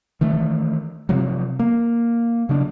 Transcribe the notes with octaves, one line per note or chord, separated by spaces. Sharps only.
D#3 E3 A3
C3 F3 F#3
A#3
C#3 F#3 D4